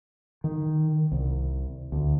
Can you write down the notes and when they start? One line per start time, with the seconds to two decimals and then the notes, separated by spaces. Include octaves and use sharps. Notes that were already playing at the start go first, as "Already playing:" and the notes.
0.44 D#3
1.12 C2
1.92 D2